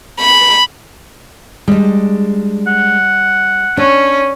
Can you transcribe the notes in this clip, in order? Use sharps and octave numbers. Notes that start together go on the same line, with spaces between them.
B5
G3 G#3 D4
F#5
C#4 D4 C#5